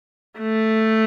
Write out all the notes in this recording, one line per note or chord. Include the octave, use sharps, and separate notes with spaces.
A3